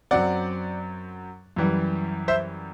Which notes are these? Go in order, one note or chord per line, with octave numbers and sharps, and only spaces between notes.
F#2 F#3 C4 D5 F#5
F#2 E3 G3
C5 E5